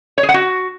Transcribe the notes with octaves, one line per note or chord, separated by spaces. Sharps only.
C#5
G#4
F#5
F#4